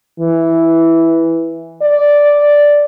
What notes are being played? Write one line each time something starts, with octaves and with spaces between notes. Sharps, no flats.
E3
D5